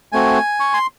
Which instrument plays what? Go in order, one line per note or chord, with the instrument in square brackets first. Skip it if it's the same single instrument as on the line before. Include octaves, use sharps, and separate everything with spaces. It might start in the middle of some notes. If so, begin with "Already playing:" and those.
[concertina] A3 C4 F#4 G#5
C#6
C6